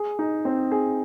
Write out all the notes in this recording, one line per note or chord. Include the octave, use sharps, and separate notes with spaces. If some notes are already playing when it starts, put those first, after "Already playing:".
Already playing: G#4
D#4
C4
G#4